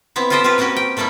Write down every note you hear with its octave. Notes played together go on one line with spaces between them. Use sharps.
B3 C4 E4
F4 G4 A4 C5 D#5 E5
C4 F4 G4 A#4 B4
A#3 C4 C#4 F#4 G4 B4
G5
G3 A3 A#3 D#4 E4